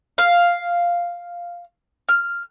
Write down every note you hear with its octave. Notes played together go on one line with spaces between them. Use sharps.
F5
F6